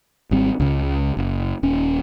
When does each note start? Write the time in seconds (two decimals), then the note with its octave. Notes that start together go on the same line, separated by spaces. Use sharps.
0.31 G#1 G3 C4
0.60 C#2 C#3
1.17 F#1
1.63 D#1 C#4